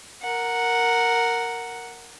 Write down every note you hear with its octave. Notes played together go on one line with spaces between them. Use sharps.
A#4 F#5